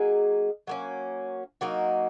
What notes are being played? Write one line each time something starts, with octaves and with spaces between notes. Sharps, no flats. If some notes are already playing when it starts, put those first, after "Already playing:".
Already playing: F#3 A#3 D#4 G#4
F#3 A#3 C#4
F#3 A#3 D#4 F#4